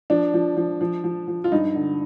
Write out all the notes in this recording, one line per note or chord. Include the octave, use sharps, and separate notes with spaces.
F3 D4
F3
F3
F3
F3
F3
F4
G2 D#4
D3